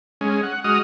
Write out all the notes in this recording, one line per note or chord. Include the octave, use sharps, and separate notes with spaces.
G#3 C#4
F#5
G#3 F#4 D#5 D#6 F6